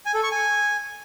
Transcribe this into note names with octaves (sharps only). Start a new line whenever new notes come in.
G#5
A4
C#6
G#5